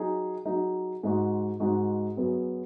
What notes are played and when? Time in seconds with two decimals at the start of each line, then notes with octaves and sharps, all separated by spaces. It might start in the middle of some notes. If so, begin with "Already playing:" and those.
Already playing: F#3 D#4 G#4
0.46 F#3 D#4 G#4
1.03 G#2 G#3 D#4 F#4
1.60 G#2 G#3 D#4 F#4
2.17 F#2 F#3 B3 G#4